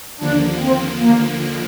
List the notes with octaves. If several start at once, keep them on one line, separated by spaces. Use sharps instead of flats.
D#2 D3 F3 A#3 D4
C4
A#3